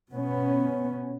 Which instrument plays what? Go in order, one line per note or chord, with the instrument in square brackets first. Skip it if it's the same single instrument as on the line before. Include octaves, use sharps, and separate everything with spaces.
[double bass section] B2 B3 C#4